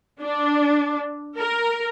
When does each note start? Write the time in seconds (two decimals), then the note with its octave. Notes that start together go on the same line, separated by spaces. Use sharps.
0.22 D4
1.38 A#4